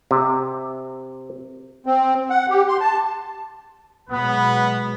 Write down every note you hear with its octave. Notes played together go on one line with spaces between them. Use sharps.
C3
C4
F#5
G4
C6
A5
B2 F#3 G#3 B3 B4